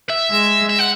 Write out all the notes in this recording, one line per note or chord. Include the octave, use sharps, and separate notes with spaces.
E5
G#3
E5
F#5